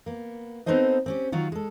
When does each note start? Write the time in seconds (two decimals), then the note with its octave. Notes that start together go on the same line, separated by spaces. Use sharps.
0.06 A#3 B3
0.66 B3 C4 D#4 A4 C5 D#5
1.06 C4 C#4 G4
1.32 D#3 F#3 F4 F#4
1.52 G#3 A4